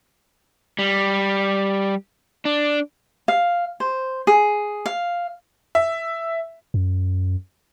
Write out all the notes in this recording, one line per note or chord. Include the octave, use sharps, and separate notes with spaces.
G3
D4
F5
C5
G#4
F5
E5
F#2